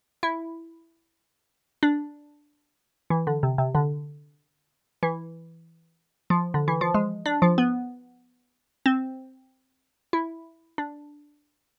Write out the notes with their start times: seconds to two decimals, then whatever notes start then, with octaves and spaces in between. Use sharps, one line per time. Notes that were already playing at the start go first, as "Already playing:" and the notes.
0.23 E4
1.83 D4
3.10 E3
3.27 D3
3.43 C3
3.58 C3
3.75 D3
5.03 E3
6.30 F3
6.54 D3
6.68 E3
6.81 F3
6.94 G#3
7.26 D4
7.42 F3
7.58 B3
8.86 C4
10.13 E4
10.78 D4